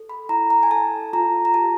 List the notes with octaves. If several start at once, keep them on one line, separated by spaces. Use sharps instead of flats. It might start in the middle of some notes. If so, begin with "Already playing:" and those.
Already playing: A4
B5
E4 A#5
A#5
G#5
A4 A5
F4 A#5
A#5
G4 A5